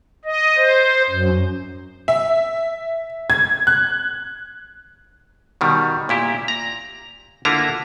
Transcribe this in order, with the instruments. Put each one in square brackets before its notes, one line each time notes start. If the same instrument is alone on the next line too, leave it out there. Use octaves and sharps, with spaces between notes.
[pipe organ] D#5
C5
F#2
[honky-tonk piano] E5
G#6
F#6
[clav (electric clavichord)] B2 D#3 G3
A#2 E4 G4
A#5
D3 A#3 E4 F4 A#5